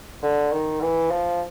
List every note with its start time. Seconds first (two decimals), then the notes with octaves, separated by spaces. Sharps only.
0.23 D3
0.52 D#3
0.82 E3
1.11 F3